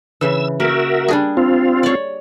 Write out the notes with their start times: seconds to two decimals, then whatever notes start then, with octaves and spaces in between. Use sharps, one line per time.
0.21 C#3 E3 E6
0.60 A#3 F#4 A#4 E5
1.08 G3 D4 G#4
1.37 C4 F4
1.83 C#5 D5